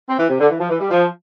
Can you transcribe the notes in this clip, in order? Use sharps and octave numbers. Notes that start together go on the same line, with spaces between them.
C4
E3
C3
D3
E3
F3
E3
G3
F3